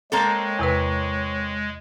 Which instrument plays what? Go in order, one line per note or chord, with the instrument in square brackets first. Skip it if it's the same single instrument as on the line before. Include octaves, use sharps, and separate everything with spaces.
[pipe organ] G#3 [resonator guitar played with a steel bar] A#3 C4 A4 [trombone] C#5
[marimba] E2 C3 B4